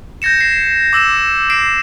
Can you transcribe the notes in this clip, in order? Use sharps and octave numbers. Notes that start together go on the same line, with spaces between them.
G6 G#6 A#6 C#7 E7
C7
D6 E6 A#6 E7
C7 D7 E7